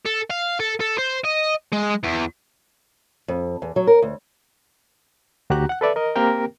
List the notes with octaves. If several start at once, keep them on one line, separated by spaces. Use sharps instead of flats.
A4
F5
A4
A4
C5
D#5
G#3
E2
F2
E2
F#3
A#4
D2
D2 F#4 G4 A#5 F#6
F#5 F#6
A4 B4 D5 E5
A#4 D#5
A#3 C4 G4 A#4 G5